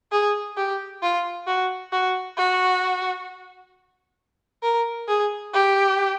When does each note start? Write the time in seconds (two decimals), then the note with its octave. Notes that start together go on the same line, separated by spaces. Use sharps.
0.12 G#4
0.57 G4
1.02 F4
1.47 F#4
1.92 F#4
2.38 F#4
4.63 A#4
5.08 G#4
5.54 G4